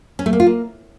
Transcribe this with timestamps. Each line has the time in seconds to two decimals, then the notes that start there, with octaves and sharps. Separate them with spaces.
0.19 C#4
0.26 A3
0.33 A#3
0.40 F4
0.47 A#3